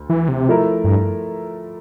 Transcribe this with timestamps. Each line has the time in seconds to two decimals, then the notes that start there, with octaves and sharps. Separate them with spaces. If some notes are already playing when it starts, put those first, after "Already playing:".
Already playing: D2
0.09 E3
0.28 C3
0.48 F3 A3 E4 A#4
0.84 G2